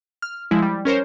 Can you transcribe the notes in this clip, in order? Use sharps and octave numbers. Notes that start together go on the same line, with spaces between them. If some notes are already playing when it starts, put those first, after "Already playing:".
F6
F3 G#3 E4
G3
C#4 A#4 C5 C#5